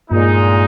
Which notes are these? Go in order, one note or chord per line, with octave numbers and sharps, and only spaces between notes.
G2 A#2 G#3 D#4